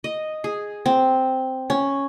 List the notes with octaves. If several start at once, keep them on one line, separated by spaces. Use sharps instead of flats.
D#5
G#4
C4
C#4